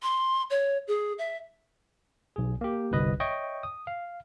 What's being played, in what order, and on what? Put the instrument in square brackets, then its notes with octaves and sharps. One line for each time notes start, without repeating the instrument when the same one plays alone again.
[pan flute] C6
C#5
G#4
E5
[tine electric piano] B1 G#4
A#3 G4
G1 C2 B4 D#5
C#5 D#5 E5 G5 C#6
D#6
F5